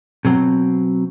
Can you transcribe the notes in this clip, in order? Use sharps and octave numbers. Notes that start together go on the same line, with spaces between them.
B2 F#3 C4